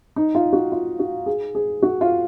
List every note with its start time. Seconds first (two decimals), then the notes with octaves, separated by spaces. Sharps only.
0.16 D#4
0.35 F4
0.53 F#4
0.72 F4
0.99 F#4
1.26 G#4
1.55 G#4
1.83 F#4
2.01 F4